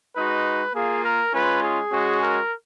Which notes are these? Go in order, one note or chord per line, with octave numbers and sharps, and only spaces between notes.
G#3 D#4 F#4 B4
A#3 F4 G#4
A#4
G#3 C#4 F4 B4
G#4
G#3 C#4 F#4
A#4